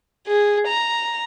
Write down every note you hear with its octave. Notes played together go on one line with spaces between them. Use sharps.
G#4
A#5